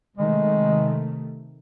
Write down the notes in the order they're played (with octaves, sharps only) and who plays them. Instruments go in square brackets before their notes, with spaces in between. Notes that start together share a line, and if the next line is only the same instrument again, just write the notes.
[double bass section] C3 D#3 A3 [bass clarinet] G#3